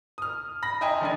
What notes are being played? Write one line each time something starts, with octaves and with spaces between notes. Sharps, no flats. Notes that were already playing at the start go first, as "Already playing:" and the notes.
D#6 F6
B5 A#6
D#5 E5 G5 G#5 A#5 C6
F1 D4 G#5